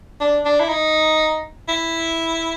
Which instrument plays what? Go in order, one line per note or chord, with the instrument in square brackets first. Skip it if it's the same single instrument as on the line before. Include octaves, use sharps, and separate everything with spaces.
[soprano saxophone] D4
D4
E4
D#4
E4